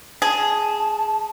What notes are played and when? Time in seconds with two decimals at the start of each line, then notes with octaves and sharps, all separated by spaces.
0.22 G#4 A5